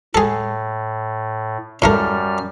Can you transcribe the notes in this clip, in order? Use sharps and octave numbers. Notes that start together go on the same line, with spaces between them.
A2 G#4 A4
F#2 A2 G3 A3 A#4 F6